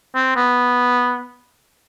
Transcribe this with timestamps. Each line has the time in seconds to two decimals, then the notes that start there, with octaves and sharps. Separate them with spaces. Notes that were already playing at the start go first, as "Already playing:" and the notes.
0.15 C4
0.36 B3